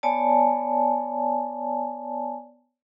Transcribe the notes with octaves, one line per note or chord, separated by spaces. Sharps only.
B3 C#5 D5 G#5 A5